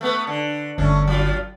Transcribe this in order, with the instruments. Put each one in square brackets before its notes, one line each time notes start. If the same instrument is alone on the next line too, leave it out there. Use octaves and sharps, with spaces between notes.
[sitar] A3 B3 B4
D3
[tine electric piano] G1 [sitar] A3 C#4 D4
[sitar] F#3 F4